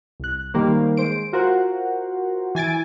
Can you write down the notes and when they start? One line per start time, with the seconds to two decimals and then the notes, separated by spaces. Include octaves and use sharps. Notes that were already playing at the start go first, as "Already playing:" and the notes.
0.20 C2 F#6
0.54 D#3 G3 A#3 C5
0.97 G#3 C5 D7
1.33 F4 F#4 A#4 C5 F#5
2.55 E3 G#5 A6 D7